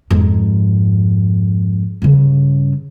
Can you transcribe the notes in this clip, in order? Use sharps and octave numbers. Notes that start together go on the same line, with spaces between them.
F2 G#2
G2 C#3